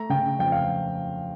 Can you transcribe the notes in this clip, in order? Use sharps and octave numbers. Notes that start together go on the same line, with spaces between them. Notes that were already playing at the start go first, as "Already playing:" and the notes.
Already playing: A3 A#5
C#3 G5
F2 G5
F5